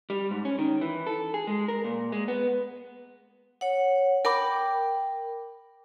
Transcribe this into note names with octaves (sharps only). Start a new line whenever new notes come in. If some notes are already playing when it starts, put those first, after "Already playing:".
G3
G#2
C#4
D#3
E3
A4
G#4
G#3
A#4
A#2
G#3
B3
C#5 F#5
A#4 G5 B5 D6